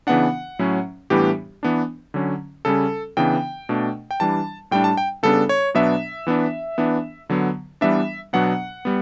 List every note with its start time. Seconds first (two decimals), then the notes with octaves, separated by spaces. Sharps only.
0.07 C#3 E3 B3 D4 F#5
0.59 A2 F#3 C#4
1.10 A2 E3 G3 B3 D4 G4
1.63 E3 B3 D4
2.14 D3 F#3 C#4
2.65 C#3 G3 C#4 A4
3.17 C#3 E3 B3 D4 G5
3.69 B2 A3 D4
4.11 G5
4.20 E3 G3 D4 A5
4.71 A2 G3 D4 G5
4.84 A5
4.97 G5
5.23 C#3 G3 B3 D4 A4
5.49 C#5
5.74 B2 F#3 B3 D4 E5
6.27 E3 B3 D4
6.78 E3 B3 D4
7.30 D3 F#3 B3
7.81 E3 G3 B3 D4 E5
8.33 B2 F#3 B3 D4 F#5
8.85 G3 B3